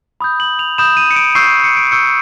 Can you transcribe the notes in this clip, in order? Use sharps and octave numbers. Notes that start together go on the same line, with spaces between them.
B5 D#6 G6
F#7
F7
B5 D#6 G6 E7
D#7
C#7
D7
C#6 E6 G6 C7
C#7
D7
C#6 E6 G6 C#7